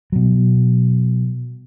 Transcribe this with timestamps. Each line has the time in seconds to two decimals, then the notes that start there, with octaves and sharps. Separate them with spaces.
0.12 B2 F#3